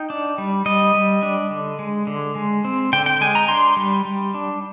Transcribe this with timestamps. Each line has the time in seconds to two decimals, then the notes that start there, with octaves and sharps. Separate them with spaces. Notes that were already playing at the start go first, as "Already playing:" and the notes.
Already playing: D#4 G5
0.10 D4
0.38 G3
0.66 G3 D#5
0.95 G3
1.23 D4
1.51 D3
1.79 G#3
2.07 D3
2.35 G#3
2.65 C4
2.93 D3 G5
3.06 G5
3.21 G#3 G#5
3.35 A#5
3.48 D4 C6
3.77 G3
4.05 G3
4.34 D4